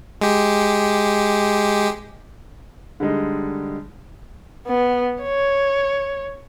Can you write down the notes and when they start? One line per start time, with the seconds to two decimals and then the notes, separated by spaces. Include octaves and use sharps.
0.21 G#3 G4
3.00 D3 G3 G#3 D#4
4.67 B3
5.23 C#5